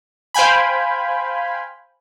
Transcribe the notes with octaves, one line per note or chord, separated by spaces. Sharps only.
C5 F5 G5 G#5 B5